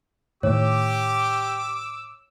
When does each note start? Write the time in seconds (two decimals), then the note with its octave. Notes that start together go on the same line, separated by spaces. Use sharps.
0.43 A2 D#3 G4 C#5 D6 E6